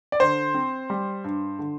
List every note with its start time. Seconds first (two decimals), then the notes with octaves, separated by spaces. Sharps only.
0.12 D5
0.20 D3 C5
0.54 C4
0.90 G3
1.24 G2
1.59 D3